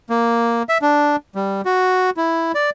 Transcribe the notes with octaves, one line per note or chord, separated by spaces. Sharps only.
A#3
E5
D4
G3
F#4
E4
D5